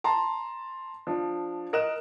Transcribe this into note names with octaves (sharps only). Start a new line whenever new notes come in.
A5 A#5 C6
F3 D4
A#4 D#5 F#6 E7